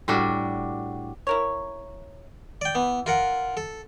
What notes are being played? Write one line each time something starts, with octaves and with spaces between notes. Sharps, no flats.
A2 G3 D4 F#4
E4 A#4 C#5
D5 G5
E3 B3
F4 A#4 F#5
A4